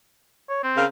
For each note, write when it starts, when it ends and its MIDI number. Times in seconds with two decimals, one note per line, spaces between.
0.49 0.61 73
0.64 0.84 60
0.77 0.85 49
0.77 0.85 70
0.77 0.85 77